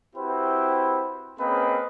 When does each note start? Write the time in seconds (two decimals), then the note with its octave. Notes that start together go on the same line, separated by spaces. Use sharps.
0.16 C4 E4 F#4 G4 B4 C5
1.40 A#3 C4 C#4 G#4 B4 D#5